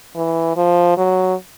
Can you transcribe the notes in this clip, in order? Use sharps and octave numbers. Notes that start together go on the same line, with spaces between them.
E3
F3
F#3